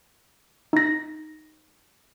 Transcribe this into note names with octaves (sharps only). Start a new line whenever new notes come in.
D#4 A#6